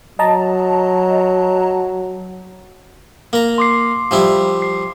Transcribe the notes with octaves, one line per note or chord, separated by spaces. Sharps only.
F#3 D#5 A5 A#5
A#3 A#5
C6 D6 C7
F3 G3 E4
C7